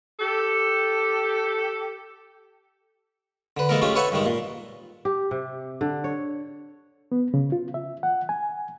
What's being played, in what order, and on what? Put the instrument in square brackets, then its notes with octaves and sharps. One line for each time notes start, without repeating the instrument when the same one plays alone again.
[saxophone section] G4 A4
[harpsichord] D3 B4
E3 G#3 A#3 A4 A#4
G#3 A3 C#4 F4 G4
A4 B4 C#5 E5 F#5 G#5
G2 D#3 G#3
A#2
[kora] G4
C3
D3
C#5
[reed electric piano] B3
C#3
F4
E5
F#5
G#5